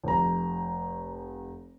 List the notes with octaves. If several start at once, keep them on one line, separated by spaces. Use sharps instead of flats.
F1 A#5